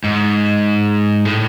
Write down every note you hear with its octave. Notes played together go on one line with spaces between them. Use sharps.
G#2
A2